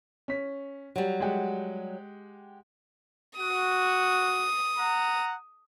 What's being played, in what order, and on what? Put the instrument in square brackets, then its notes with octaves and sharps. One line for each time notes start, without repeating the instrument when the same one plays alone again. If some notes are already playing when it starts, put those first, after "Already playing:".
[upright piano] C#4 B6
[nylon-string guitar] F#3 G3
[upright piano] G#3 G4 F#5
[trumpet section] F#4 [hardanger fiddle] D#6
[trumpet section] F#5 A#5